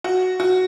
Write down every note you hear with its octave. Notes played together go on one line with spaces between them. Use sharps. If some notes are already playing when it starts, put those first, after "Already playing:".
F#4
F#4